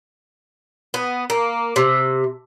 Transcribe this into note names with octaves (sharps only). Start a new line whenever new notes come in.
B3
A#3
C3